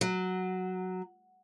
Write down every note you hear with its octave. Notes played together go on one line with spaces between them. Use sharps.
F#3